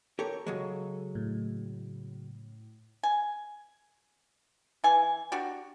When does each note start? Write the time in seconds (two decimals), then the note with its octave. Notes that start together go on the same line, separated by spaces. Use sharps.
0.19 G4 A4 A#4 C#5
0.46 C#3 F#3 G#3
1.15 A2
3.03 G#5
4.84 E3 G#5
5.32 D4 F#4 G4